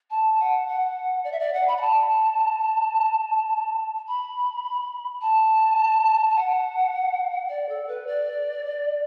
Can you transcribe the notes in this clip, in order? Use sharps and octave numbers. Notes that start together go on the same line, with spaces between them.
A5
F#5
F#5
D5
E5
D5
F#5
B5
B5
A5
B5
A5
A5
F#5
D5
A4
B4
D5